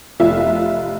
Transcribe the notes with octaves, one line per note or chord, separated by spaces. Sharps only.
F1 F4 E5